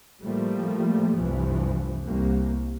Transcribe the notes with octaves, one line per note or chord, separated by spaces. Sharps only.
A2 F3 G3 A3 A#3
F1 C2 G2 E3 F3
C2 A#3